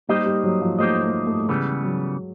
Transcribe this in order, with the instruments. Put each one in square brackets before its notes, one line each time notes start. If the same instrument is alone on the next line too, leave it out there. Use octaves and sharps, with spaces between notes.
[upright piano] G3 [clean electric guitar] A#3 D#4 G4 C5 D#5
[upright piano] G3
F#3
F3
[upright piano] A3 [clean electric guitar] A#3 D#4 G4 C5 D#5
[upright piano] A3
A3
A3
[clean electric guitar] C#3 E3 G3 B3 [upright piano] G#3
[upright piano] F#3